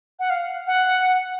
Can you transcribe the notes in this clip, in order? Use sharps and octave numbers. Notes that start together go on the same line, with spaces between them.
F#5
F5
F#5